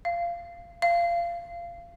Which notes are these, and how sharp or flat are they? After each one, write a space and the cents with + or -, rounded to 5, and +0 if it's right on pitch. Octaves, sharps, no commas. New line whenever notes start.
F5 -20
F5 -25